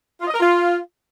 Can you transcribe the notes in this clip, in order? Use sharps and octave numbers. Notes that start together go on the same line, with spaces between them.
F4
D#5
A#4
F4